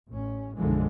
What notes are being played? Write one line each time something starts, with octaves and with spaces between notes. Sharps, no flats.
A1 C#4
B1 F#2 D3 E3 F3 G#3